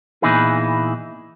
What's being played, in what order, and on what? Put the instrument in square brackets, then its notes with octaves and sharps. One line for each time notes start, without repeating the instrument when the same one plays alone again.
[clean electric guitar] A#2 E3 B3 D#4 E4 G#4